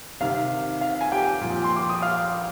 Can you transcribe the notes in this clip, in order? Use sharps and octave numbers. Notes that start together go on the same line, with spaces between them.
C3 D#3 F5
F5
G#5
G4 G5
A#2 F3
C6
D6
D#6
F5 F6